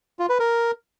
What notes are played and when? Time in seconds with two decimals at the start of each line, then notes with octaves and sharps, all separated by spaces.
0.19 F4
0.29 B4
0.40 A#4